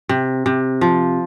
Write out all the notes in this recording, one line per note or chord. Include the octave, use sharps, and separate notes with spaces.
C3
C3
F3